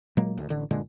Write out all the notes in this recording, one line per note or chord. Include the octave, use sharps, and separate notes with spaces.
A#2 F#3 G#3 A#3
D2
A1 D3
F#1 A#2 D3 G#3